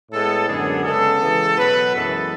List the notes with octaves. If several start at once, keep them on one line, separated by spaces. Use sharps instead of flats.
A2 G#3 B3 A4
F#2 D3 G#3 B3 G#4
C#3 G#3 B3 A4
C#3 E3 G#3 B3
B2 F#3 B3 B4
F#2 E3 G#3 B3 A4